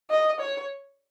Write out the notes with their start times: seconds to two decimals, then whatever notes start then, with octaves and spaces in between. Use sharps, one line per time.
0.10 D#5
0.40 C#5